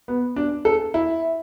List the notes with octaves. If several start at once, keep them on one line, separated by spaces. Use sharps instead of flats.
B3
D4
A4
E4